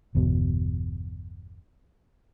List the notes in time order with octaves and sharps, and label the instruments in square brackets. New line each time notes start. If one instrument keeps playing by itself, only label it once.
[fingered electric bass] G1 E2 B2